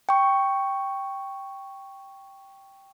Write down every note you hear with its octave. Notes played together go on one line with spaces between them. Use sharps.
G5 C#6